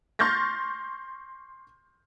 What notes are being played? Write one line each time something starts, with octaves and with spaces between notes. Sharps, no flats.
C6 C#6 F6 G6 A6 A#6